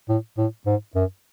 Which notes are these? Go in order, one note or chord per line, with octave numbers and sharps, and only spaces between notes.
A2
A2
G#2
F#2